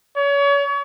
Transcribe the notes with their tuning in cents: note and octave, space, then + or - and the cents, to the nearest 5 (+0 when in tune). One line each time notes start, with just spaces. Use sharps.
C#5 +35